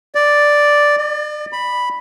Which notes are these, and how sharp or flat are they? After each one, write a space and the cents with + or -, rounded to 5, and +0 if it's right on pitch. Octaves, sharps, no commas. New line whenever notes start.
D5 +0
D5 +40
B5 -5